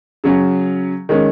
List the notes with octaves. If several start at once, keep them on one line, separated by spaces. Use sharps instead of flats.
C#3 F#3 C#4
D#3 G#3 C#4